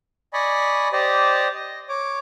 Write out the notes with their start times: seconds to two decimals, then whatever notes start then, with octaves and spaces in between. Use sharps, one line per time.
0.33 D5 D#5 G#5 B5 C#6
0.92 G4 C5 D5 D#5
1.55 D#5
1.89 C#5 D6